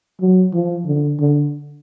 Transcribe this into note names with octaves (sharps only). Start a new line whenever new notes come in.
F#3
F3
D3
D3